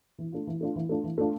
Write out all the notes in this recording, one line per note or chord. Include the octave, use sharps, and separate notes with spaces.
E3
A3 D4 F4
E3
A3 D4 F4
E3
A3 D4 F4
E3
A3 D4 F4